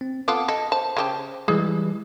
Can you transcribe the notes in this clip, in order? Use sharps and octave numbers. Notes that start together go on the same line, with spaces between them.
C4
B3 F4 A4 F#5 D6
A4 D#5
C5 A5
C#3 G4 A5
E3 G3 G#3 G#4